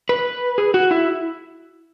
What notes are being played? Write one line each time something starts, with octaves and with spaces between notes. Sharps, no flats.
B4
G#4
F#4
E4